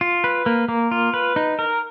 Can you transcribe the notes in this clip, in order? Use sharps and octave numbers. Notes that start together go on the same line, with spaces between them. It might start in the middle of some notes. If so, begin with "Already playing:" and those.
F4
B4
A#3
A#3
F4
B4
D#4
A#4